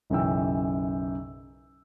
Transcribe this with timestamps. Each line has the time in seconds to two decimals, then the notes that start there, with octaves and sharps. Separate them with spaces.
0.10 B1 F#2 C#3 E3 G5 E6